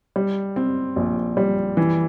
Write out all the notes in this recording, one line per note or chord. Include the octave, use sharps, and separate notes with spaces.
G3
C4
A#1
G3
E3